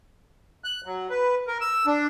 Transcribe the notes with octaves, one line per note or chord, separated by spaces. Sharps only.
F#6
F#3
B4
A#4
E6
D4